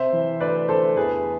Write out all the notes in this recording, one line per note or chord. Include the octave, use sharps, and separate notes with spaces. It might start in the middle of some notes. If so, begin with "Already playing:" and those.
Already playing: C3 C5 E5
E3
D2 B4 D5
D2 A4 C5
E2 G#4 B4